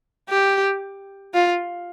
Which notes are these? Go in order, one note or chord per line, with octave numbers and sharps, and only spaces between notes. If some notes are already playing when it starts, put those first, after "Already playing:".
G4
F4